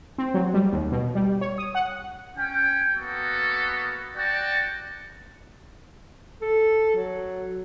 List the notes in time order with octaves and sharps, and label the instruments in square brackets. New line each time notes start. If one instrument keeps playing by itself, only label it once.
[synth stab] C4
F#3
G3
D#2
B2
G3
C#5
D#6
F#5
[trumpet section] C#4 G5
A#3 B3 F#4 A4
F#4 D5 G5 A5
[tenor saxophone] A4
F#3